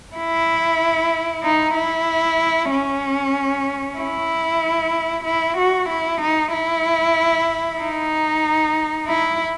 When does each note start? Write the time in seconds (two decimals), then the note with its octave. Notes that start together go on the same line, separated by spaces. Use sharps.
0.16 E4
1.43 D#4
1.75 E4
2.71 C#4
3.99 E4
5.25 E4
5.58 F#4
5.89 E4
6.21 D#4
6.53 E4
7.80 D#4
9.08 E4